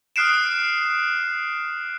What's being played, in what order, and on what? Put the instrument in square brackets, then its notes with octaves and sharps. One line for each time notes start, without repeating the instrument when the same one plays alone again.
[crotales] D#6 F6 F#6 C7 D7 E7